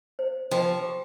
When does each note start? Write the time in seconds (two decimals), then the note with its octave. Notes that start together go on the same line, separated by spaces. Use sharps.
0.19 C5
0.51 F3 G5
0.84 G4